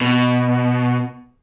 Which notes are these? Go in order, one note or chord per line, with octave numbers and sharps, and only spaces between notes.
B2